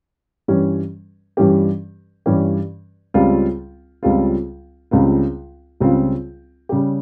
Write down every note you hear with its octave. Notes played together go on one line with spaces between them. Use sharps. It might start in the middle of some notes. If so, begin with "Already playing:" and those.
G2 E3 G3 C#4 G4
G2 E3 G3 C#4 G4
G2 E3 G3 C#4 G4
C#2 C#3 G3 C4 F4
C#2 C#3 G3 C4 F4
C#2 C#3 G3 C4 F4
C#2 C#3 G3 C4 F4
C#3 G3 C#4 G4